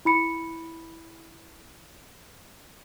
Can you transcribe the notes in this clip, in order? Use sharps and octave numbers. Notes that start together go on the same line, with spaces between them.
E4 B5 C#7